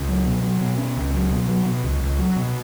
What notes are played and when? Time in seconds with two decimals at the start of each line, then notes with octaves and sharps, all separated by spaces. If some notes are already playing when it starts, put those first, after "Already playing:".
Already playing: C#2
0.09 F#3
0.26 B2
0.43 F#3
0.61 B2
0.78 C#4
0.97 C#2
1.14 F#3
1.31 B2
1.49 F#3
1.66 B2
1.84 C#2
2.02 C#2
2.19 F#3
2.36 B2